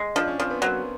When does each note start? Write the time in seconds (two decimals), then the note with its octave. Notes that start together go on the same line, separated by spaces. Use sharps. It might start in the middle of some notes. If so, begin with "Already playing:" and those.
Already playing: G#3
0.16 F3 D4
0.28 C#4
0.39 F3 C4
0.51 B3
0.62 F#3 A#3